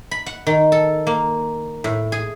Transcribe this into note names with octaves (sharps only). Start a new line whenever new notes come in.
B5
F#5
D#3
A4
A#3
A2
G#4